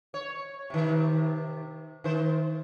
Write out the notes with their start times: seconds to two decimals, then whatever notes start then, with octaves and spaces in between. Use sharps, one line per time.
0.14 C#5
0.70 C3 D#3
2.04 D#3 C5